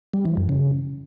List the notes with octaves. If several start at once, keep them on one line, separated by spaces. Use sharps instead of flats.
G3
E3
F#2
C#3